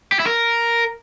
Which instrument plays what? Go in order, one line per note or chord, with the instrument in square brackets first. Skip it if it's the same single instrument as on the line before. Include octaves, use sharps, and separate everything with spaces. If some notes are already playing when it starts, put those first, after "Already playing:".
[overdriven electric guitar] G4
E4
A#4